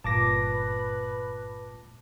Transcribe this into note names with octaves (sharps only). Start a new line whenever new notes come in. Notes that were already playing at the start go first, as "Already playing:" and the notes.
G1 A#2 B4 A5 D6 A#6